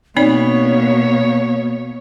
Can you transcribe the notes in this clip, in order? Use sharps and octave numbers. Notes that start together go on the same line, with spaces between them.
B2 A#3 C4 D#4 C#5 D5